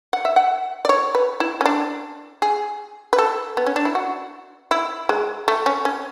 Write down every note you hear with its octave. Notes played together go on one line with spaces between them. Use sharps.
F#5
E5
F#5
D5
C#5
B4
E4
C#4
D4
G#4
B4
A4
B3
C#4
D4
E4
F#4
E4
G#3
A3
C#4
C#4